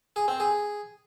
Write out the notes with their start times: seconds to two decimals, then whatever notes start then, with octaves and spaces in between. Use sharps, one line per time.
0.16 G#4
0.28 C4
0.40 G#4